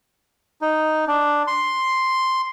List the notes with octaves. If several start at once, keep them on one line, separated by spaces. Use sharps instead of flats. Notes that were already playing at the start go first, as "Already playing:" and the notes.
D#4
D4
C6